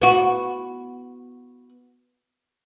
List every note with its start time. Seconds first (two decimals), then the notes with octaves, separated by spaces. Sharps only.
0.02 B3 F#4